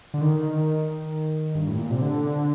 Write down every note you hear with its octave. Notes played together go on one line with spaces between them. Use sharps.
D3
D#3
G2
A2
A#2
C3
D3